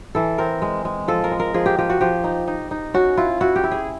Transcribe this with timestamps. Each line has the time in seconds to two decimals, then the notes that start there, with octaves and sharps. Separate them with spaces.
0.15 E3 A4
0.38 C4 A#4
0.62 G#3
0.85 G#3
1.08 F3 A4
1.24 A#4
1.31 G#3
1.40 A#4
1.54 F3 G#4
1.66 G4
1.78 F3 G4
1.90 F#4
2.01 F3 G4
2.24 D#4
2.47 D#4
2.71 D#4
2.94 C#4 F#4
3.17 E4 F4
3.41 E4 F#4
3.56 G4
3.64 E4
3.71 G#4